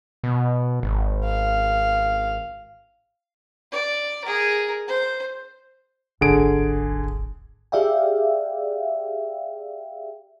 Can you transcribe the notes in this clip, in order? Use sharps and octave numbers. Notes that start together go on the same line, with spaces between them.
B2
G#1
F5
D5
G#4 A#4
C5
D#1 G#1 D3 G#4 D7
G4 G#4 D5 E5 F5 G5